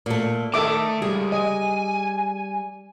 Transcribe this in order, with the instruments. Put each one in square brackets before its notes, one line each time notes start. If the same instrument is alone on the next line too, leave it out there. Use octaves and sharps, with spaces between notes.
[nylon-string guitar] A#2 A3
[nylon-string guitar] D#3 [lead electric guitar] A3 A5 [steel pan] A4 E5 D6
[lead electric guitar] C#2 [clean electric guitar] G3 [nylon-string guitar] G#4
[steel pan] D#5 [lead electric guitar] G#5